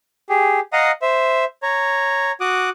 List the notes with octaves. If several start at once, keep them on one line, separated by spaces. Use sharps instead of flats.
G4 G#4
D#5 F5 F#5 A#5 D#6
C5 E5
C#5 A#5
F#4 D6 D#6 F#6